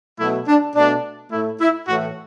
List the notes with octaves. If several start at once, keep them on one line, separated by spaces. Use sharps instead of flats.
B2 F#3 A3 E4
D4
B2 A3 D4
A2 A3 E4
E4
A2 E3 A3 F#4